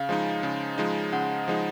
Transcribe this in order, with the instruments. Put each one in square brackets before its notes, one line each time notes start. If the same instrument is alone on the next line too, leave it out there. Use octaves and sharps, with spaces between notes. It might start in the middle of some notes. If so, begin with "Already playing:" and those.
Already playing: [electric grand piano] C#3 [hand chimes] F5
[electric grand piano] F3 G#3 D#4
C#3
F3 G#3 D#4
[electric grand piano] C#3 [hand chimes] F#5
[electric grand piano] F3 G#3 D#4